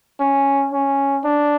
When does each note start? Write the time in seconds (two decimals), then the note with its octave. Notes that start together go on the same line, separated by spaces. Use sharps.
0.20 C#4
0.72 C#4
1.24 D4